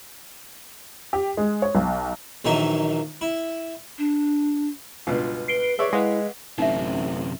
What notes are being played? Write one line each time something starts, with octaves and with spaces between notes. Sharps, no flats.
G4
G#3
C#5
B1
A#1 D#3 E3 F#3 D#4 E5
E4
D4
C#2 G2 B2 F4
B4 C7 D7 G7
G#4 B4 C#5 D5 E5
G#3 E4 B4 F5 F#5
A1 F#2 C3 D#4 E5